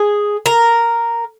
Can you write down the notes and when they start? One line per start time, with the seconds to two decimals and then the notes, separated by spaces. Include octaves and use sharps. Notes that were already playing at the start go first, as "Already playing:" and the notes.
Already playing: G#4
0.46 A#4